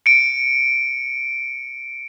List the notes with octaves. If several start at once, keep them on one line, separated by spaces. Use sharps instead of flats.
C#7 D7